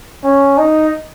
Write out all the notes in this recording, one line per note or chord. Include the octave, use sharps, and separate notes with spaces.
C#4
D#4